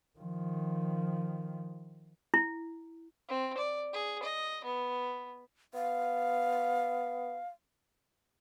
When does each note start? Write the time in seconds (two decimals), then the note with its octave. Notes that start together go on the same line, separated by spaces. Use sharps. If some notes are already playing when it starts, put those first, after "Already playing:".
0.19 D#3 F3
2.34 E4
3.28 C4
3.58 D5
3.93 G#4
4.23 D#5
4.65 B3
5.74 B3 F5